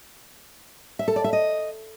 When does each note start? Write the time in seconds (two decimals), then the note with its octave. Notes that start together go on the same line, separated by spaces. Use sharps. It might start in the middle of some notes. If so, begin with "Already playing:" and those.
0.99 E5
1.08 A4
1.16 D5
1.24 E5
1.33 D#5